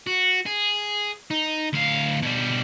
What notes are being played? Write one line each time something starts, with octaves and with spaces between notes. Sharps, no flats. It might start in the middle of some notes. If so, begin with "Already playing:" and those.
F#4
G#4
D#4
D2 F5
B2 G3